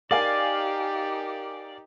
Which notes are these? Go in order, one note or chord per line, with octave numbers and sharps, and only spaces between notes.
D#4 G4 A#4 D5 F5 G#5